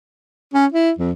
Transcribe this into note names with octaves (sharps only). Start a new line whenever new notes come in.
C#4
E4
F2